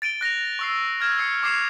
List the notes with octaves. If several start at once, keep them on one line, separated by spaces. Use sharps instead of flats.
A6 D7 D#7 G7
F#6 A#6 D7 F7
C#6 E6 C7
F6 G#6 E7
E6 C7 C#7
C#6 D6 G#6 C7 E7 F7